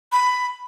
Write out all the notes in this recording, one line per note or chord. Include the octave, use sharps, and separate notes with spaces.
B5